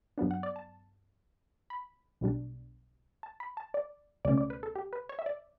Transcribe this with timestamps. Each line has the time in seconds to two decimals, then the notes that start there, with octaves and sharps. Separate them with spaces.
0.18 G2 F#3 B3 D4
0.31 F#5
0.43 D5
0.56 A5
1.70 B5
2.21 B1 B2 G3 D4
3.23 A5
3.40 B5
3.57 A5
3.74 D5
4.25 C#2 B2 A3 C#4 D5
4.38 D5
4.50 B4
4.63 A4
4.76 G4
4.93 B4
5.09 C#5
5.19 E5
5.26 D5